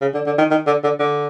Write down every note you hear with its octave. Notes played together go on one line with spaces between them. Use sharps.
C#3
D3
D3
D#3
D#3
D3
D3
D3